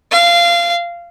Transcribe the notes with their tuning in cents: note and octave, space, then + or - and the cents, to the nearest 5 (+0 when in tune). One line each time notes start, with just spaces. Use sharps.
F5 -20